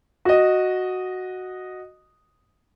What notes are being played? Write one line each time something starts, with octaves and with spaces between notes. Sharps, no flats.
F#4 D#5